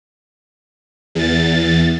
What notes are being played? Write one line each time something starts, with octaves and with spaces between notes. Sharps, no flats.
E2 A6